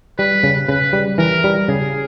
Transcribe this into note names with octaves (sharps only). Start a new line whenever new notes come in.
G3 B4
C#3
C#3 B4
G3
E3 A#4
G3
C#3 G#4